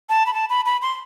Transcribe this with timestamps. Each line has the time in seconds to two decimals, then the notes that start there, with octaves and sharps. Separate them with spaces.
0.09 A5
0.26 B5
0.34 A5
0.50 B5
0.66 B5
0.82 C6